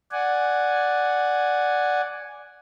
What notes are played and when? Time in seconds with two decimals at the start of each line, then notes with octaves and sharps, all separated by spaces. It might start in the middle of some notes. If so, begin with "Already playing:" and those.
0.12 D5 F#5 G#5